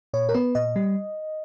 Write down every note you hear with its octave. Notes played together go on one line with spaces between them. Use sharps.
A#2 C#5
A#4
B3 B4
A#2 D#5
G3